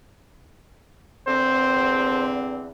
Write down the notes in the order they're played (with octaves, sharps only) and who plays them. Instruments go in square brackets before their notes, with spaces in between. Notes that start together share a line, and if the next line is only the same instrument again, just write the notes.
[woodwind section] E2 D3 C4 [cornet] C5